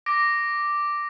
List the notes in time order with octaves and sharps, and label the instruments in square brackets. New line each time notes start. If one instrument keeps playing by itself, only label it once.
[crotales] D6 A#6 D7